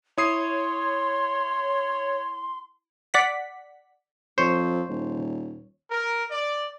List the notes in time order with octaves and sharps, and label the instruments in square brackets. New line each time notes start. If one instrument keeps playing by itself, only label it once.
[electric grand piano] E4 D#6 C7 [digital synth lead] C#5 [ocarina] C6
[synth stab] D5 F#5 B6
[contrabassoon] F2 [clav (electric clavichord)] C5 [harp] C#5
[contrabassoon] D#1
[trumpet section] A#4
D5